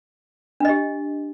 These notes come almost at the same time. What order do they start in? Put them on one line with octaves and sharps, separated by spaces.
D4 D#5 G4